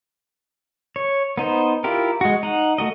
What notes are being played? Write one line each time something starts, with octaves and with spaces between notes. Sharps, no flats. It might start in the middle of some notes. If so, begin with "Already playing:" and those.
C#5
B3 D#4 C5
E4 F4 G4 A#4
G#3 F#4
D#4 F#5
A3 F#4 D#5